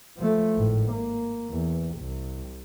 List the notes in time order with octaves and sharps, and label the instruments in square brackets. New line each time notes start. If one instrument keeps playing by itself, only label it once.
[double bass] F3 A3
G#1 A2
A#3
E2
C2